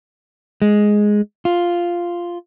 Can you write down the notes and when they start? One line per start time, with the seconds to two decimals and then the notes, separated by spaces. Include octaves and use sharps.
0.62 G#3
1.45 F4